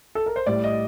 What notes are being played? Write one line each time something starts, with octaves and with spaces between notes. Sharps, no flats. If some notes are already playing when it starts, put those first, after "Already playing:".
A4
A#4
C5
A2 G3 D5
D#5